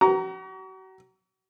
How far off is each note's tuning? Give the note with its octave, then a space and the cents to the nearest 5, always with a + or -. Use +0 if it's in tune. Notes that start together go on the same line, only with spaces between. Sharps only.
F#4 +40 A#5 +0